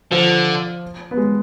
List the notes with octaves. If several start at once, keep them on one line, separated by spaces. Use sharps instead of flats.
D3 F3
B3
G#3